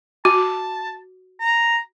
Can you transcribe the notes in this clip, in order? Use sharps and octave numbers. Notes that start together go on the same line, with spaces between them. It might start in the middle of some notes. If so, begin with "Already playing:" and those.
F#4 A5
A#5